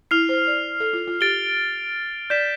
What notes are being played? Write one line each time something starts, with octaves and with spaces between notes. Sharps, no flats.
E4 F6 C7 F7
C5
D5
A4
F4
F4
G4 A6 D7 G7
D5 G6 B6 E7